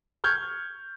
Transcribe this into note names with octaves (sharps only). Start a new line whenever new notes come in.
C#6 F6 G6 G#6